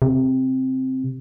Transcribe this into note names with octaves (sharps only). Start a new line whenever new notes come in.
C3